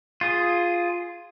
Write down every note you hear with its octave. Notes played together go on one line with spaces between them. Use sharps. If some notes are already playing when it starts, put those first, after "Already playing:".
F4 G#4